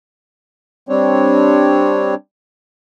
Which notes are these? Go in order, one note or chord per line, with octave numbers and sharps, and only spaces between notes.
G3 C4 D4 C#5